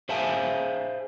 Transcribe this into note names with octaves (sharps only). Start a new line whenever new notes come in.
G#4 C5 E5 F5 G#5 A5